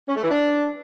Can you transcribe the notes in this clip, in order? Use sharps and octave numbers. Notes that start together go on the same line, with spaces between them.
C#4
A3
E3
D4